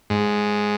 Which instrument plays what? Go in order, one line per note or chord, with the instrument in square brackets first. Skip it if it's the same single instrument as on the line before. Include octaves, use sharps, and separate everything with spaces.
[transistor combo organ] G#2